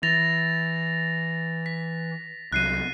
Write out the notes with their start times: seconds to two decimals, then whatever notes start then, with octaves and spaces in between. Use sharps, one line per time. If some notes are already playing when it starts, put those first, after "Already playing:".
0.03 E3 A6 A#6 F7
1.66 B6
2.52 C2 F#3 F#6 C7 D#7